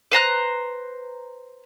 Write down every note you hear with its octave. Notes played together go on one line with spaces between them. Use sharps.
B4 C5 A#5 F#6